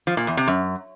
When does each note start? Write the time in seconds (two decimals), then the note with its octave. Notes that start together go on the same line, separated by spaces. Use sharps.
0.07 F3
0.17 A#2
0.27 E2
0.37 C3
0.47 F#2